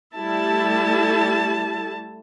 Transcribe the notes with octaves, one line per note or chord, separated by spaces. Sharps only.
G3 A3 E4 A5